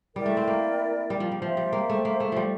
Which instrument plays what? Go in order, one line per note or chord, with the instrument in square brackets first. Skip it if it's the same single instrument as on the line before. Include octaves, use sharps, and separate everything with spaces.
[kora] G3 [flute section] E4 A#4 D5 G5
[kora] A3
C4
A#3
G3
F3
G3
[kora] F3 [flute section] C5 E5 G5 C6
[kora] G3
A#3
A3
A#3
A3
F3 G3